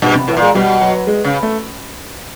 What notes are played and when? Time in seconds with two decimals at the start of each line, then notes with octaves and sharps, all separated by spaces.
0.02 G2 B2
0.15 C3
0.28 A2 E3
0.37 A#2
0.42 G#3
0.55 B2 G3
0.81 F#3
1.07 G#3
1.24 C#3
1.43 A3